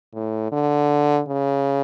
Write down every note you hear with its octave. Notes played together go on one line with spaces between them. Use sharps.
A2
D3
C#3